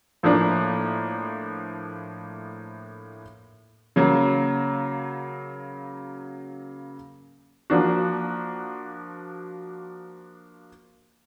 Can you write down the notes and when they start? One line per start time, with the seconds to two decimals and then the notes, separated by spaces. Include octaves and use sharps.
0.23 A2 F3 A#3 D4
3.96 C#3 F#3 A#3
7.70 F3 A#3 D4 F#4